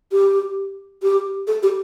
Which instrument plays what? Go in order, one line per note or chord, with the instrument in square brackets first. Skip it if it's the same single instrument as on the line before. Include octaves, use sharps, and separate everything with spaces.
[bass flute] G4
G4
A4
G4